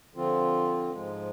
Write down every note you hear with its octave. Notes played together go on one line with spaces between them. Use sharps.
D3 F3 C4 F4
G#2 F3 G#3